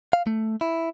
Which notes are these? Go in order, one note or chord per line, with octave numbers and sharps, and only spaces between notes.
F5
A3
E4